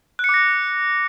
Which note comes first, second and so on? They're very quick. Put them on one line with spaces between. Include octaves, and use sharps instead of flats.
F#6 C#7 D6 A#6